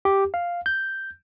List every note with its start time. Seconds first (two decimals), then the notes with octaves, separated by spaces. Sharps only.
0.05 G4
0.34 F5
0.66 G6